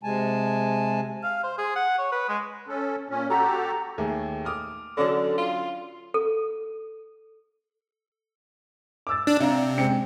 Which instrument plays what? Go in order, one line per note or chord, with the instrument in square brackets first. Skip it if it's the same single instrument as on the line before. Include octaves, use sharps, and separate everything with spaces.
[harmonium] C3 G#3 G#5 A5
[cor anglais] F5
C5
G#4
F#5
C#5
B4
G#3
[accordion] C#4 A4
A#2 C#4
[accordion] F#4 G4 A4 [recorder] A#5
[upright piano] D#2 A3 G#4
D6 D#6 F6
[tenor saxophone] D3 [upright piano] F#3 C#4 D4
[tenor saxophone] F4
[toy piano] A4
[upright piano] D6 E6 A6
[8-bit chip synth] D4
[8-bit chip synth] C3 [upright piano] D5 F5 A#5
[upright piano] G#3 C4 C#7